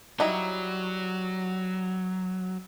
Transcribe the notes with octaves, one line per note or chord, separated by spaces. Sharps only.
F#3 G3 D#4 E4